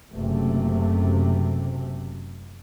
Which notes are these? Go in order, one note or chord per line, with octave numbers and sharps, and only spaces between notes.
F#1 C3 A3